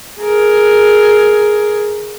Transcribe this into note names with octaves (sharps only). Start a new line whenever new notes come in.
G#4 A#4